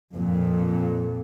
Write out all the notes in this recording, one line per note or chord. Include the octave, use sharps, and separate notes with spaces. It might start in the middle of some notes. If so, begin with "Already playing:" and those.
F2 A#2